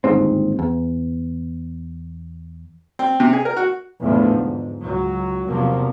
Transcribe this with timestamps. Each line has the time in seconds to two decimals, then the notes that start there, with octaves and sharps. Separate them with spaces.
0.04 G1 D#2 G#2 C4
0.59 E2
2.99 C4
3.20 C3
3.33 G#4
3.45 A#4
3.57 F#4
4.02 E2 A2 D3 F3
4.36 G#2
4.80 C#2 F#3
5.48 E2 C3 F3 F#3 A#3